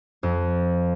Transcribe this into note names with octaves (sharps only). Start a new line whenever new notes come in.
F2